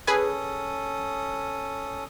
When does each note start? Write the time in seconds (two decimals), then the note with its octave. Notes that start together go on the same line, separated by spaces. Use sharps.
0.07 C#4 G#4 A4 B4 G#5 D#6